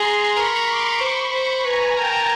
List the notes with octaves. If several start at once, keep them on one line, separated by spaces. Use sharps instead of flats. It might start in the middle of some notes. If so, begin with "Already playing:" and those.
Already playing: G#4 A#5 C6
A#4 B5 C#6
C6 D6
C5 B5 C#6
C5
B4 G#5 A#5
A#4 G5 A5